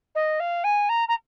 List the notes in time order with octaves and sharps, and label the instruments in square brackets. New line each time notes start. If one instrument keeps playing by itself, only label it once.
[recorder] D#5
F5
G#5
A#5
A#5